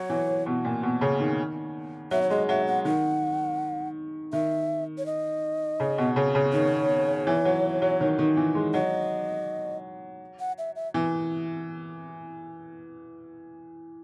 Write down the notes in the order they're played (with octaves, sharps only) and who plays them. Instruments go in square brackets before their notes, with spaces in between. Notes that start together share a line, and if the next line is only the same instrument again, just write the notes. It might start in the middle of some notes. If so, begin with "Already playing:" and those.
Already playing: [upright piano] F#3 [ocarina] C#5
[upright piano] E3
B2
A#2
B2
C#3
D#3
[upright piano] F#3 [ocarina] E5
[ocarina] C#5
[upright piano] G#3 [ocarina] D#5
[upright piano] F#3 [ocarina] E5
[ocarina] F#5
[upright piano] D#3 [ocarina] F#5
[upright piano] D#3 [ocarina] E5
[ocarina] C#5
D#5
[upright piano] C#3
B2
C#3
C#3
[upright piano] D#3 [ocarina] C#5
[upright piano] E3
F#3
F#3
D#3
D#3
E3
G#3
[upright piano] F#3 [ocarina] D#5
[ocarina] F#5
E5
E5
[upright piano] E3